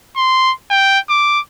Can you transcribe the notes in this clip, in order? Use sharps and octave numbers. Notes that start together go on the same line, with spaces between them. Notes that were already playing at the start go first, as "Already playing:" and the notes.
C6
G5
D6